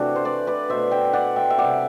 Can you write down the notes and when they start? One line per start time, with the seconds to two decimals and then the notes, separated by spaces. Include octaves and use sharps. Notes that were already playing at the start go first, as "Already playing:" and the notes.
Already playing: C3 E3 A3 D4 F#4 A4
0.16 C5
0.25 B4 D5
0.47 B4 D5
0.69 B2 A3 C5 E5
0.91 E5 G5
1.13 D5 F#5
1.36 E5 G5
1.50 E5
1.58 C3 G3 D5 F#5